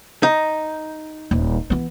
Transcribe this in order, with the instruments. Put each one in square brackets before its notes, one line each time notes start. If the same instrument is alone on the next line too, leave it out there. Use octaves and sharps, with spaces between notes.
[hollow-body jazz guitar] D#4
[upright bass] D#1
E3 B3